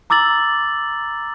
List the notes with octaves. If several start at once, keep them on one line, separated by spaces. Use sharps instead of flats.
A#5 D6 E6 A6 F#7